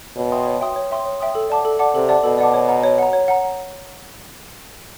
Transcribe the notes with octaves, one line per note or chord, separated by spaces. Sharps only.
B2 C#5
E5 G5 C6 D#6
C#5
E5 G5 C6 D#6
C#5
E5 G5 C6 D#6
C#5
E5 G5 C6 D#6
A4
D5 F#5 A5 D6
A4
D5 F#5 A5 D6
C3 A4
D5 F#5 A5 D6
B2 A4
D5 F#5 A5 D6
C#5
F#5 A#5
C#5
F#5 A#5
C#5
F#5 A#5